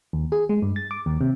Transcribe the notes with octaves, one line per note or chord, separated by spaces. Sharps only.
D#2
G#4
G#3
G2
A6
D6
D#2
C3